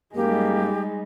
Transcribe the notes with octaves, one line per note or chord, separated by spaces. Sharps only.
F#2 G3 G#3 A#3 D#4 G4